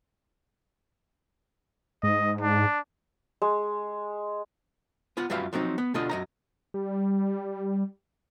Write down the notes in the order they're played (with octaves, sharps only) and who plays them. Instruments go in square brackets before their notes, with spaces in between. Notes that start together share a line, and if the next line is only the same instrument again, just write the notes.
[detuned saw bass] G#2 [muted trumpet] D#5
[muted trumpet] D4
[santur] G#3
[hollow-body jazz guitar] B3 F4 F#5
F#2 G3 F4 B4 E5 F5
F3 F#3 C4 D#4
B3
B2 D3 F4 D#5
F#2 D#5 A#5
[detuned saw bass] G3